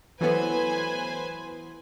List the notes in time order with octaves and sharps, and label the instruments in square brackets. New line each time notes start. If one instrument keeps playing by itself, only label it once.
[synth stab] E3 B3 [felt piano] F#3 A3 [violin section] B4 C5 G#5